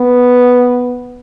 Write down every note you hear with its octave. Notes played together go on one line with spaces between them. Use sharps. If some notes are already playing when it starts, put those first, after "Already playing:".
Already playing: B3